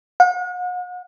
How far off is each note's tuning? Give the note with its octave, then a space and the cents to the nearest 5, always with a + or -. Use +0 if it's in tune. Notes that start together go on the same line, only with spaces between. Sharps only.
F#5 -40